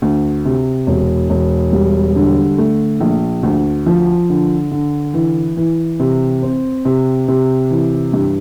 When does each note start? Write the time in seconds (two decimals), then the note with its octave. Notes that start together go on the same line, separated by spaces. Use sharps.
0.02 D2
0.45 C3
0.87 E1
1.30 E1
1.73 G3
2.16 D3
2.58 A3
3.00 A#1
3.43 D2
3.86 F3
4.30 D3
4.71 D3
5.14 E3
5.57 E3
6.00 C3
6.43 C4
6.85 C3
7.28 C3
7.71 E3
8.13 G2